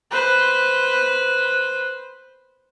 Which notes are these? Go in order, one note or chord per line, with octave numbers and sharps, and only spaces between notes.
B4 C5